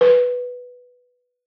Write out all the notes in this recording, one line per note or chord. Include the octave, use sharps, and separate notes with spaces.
B4